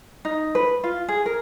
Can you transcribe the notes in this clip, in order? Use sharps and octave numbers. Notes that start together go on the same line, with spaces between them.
D#4
B4
F4
G#4
A#4